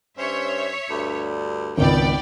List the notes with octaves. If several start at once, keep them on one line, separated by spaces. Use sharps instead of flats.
G2 C#4 C5 C#5 E5
D2 G2
G#1 C#2 B3 D5 G5